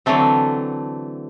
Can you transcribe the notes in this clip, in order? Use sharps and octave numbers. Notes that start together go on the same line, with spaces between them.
D3 E3 F#3 A3 C4